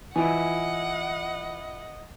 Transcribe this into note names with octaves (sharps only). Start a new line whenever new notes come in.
E3 E4 F4 D#5 F#5 G#5